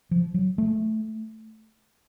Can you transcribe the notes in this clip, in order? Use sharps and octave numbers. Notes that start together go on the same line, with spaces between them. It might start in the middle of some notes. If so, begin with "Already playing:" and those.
F3
F#3
A3